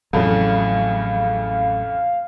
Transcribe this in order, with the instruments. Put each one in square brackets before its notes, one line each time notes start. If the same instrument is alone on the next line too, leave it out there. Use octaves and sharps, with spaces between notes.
[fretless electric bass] A1 F#3 [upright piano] F2 A2 C#3 [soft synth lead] F5